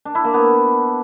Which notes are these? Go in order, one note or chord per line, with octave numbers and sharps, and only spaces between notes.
D4
E4
A#3
B3